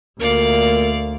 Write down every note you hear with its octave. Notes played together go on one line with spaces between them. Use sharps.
D2 A#2 A3 A#3 A#4 D5 F5